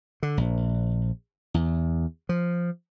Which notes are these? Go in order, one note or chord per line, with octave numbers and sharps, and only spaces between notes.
D3
A#1
E2
F3